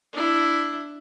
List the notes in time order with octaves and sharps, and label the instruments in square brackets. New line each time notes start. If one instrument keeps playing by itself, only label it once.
[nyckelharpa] D4 E4